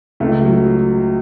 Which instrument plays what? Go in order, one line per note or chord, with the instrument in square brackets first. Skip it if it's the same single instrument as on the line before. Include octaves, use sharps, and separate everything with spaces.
[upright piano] C#2 A3
F#3